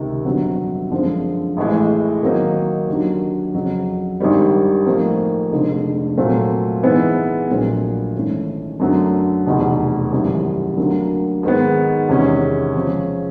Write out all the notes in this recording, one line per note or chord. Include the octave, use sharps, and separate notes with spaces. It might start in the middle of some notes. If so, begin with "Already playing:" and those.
Already playing: C#2 C3 D#3
G1 F2 D3 F#3 B3
F#2 D3 F3 G#3 C4
A1 A2 E3 G#3
D#3 F#3 A#3 D#4
D#2 D3 F#3
F2 C#3 F#3
G#1 G2 D#3 G3
A2 F3 A#3 D#4
F1 F2 D3 F3 G#3
A#2 F#3 A3 C4 F4
G#2 E3 G#3 B3 E4
A#1 A#2 F#3 A3
G#1 G#2 E3 A3 C#4
F#2 D3 F#3 A3
F1 E2 B2
G#1 F#2 C#3 E3 G3
D2 D3 F#3 A#3
G#2 D#3 G#3 B3
E2 C3 D#3 G#3 C#4
C#3 F3 G#3 C#4